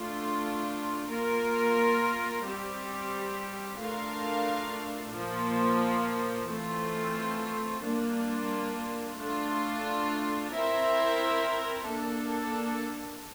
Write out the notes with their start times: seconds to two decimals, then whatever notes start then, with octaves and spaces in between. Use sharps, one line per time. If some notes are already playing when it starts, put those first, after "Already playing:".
Already playing: A3 D4 F4
1.09 A#3 F4 A#4
2.44 G3 C4 G4
3.79 A3 D4 F4 A#4 F5
5.14 A#2 F3 A#3
6.48 E3 A3 C4 F4
7.83 G3 A#3 D4 F4
9.18 A3 D4 F4
10.52 C4 E4 A#4 E5
11.86 A#3 D4 A4